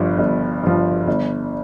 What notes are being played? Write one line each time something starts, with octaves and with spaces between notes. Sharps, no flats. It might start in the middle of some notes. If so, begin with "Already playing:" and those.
Already playing: G1 G2 F3
G1
G2 F3
G1